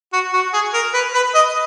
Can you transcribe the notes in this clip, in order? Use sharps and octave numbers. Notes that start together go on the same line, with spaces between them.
F#4
F#4
G#4
A#4
B4
B4
D#5